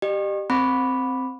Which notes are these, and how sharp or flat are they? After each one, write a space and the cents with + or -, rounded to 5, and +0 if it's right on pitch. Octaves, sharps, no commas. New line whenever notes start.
G4 +0 D#5 -45
C4 +0 B5 +0 D6 +0